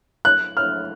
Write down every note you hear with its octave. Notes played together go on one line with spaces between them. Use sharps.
F#6
F6